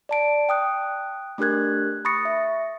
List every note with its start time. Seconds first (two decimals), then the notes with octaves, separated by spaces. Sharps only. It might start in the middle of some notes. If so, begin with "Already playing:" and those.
0.09 D5 A5 D7
0.49 G5 D#6 F#6
1.38 A3 D4 G4 A#4 F#6 G#6
2.05 B5 C#6 D#6 A6 A#6 C#7
2.25 E5